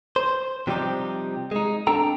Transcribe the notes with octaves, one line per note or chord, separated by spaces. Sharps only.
C5
C3 F3 G3 C4 D#4 G4
G#3 D#4
C4 D4 A4 G5 A#5